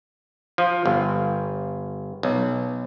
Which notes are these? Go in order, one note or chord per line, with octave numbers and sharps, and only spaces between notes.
F3
G1
B1